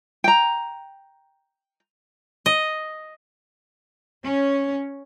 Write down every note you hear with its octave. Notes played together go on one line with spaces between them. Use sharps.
G5 A#5
D#5
C#4